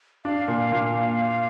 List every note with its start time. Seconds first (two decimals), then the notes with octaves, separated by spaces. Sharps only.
0.25 D4 F5
0.48 A#2
0.72 A#2